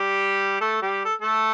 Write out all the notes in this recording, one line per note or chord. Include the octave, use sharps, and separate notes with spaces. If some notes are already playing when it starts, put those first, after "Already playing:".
Already playing: G3 G4
A3 A4
G3 G4
A4
A3 A4